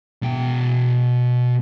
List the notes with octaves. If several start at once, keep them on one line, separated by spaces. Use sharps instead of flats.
B2 G5